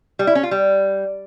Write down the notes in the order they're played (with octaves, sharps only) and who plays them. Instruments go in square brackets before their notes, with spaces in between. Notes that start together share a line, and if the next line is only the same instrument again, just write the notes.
[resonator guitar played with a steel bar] G3
E4
C#4
F4
G3